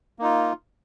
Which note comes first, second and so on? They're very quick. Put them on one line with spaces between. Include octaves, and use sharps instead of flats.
A#3 D#4 F4